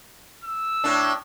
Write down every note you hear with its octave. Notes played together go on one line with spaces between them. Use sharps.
E6
A2 D4